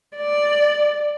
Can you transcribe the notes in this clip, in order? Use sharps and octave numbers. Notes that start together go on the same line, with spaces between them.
D5